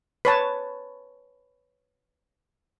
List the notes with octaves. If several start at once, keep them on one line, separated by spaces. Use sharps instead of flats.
B4 C#5 A5